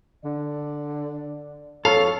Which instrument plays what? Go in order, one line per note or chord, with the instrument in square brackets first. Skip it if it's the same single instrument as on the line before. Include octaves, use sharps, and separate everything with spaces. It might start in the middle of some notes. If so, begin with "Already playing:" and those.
[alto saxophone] D3 [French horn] D5
[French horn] F2 [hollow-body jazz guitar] A4 [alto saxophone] C#5 [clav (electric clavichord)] F5